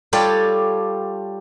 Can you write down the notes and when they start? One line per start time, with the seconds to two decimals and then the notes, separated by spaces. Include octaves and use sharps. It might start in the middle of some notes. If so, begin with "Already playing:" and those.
0.13 G3 F4 G4 A4 C#5 D5